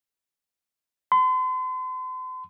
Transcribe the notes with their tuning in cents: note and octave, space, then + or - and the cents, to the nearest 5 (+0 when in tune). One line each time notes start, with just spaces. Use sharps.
C6 -40